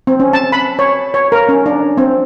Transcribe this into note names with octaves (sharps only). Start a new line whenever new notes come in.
C4
C#4
A5
B5
C#5
C#5
A#4
C#4
D4
C4